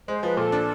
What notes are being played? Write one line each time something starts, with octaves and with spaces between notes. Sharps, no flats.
G#3 C5
F3 B4
A#2 A4
D4